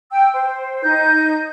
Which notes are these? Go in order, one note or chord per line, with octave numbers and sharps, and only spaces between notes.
G5 E6
C5
D#4 G6